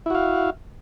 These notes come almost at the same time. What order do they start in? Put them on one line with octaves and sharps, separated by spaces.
E4 F#4 F5